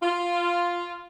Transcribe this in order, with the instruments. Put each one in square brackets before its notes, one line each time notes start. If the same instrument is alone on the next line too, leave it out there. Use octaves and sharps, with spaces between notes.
[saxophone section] F4